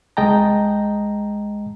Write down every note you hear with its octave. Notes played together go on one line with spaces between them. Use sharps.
C2 G#3 D#5 G5 A5 A#5